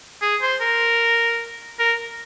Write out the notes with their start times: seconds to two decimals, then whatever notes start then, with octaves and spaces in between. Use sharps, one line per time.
0.22 G#4
0.42 C5
0.61 A#4
1.79 A#4